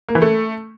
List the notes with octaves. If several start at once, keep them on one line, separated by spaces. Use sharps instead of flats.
A#3
E3
A3